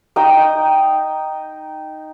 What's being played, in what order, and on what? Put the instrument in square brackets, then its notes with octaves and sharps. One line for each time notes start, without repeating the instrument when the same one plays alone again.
[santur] D#4 G5 D#6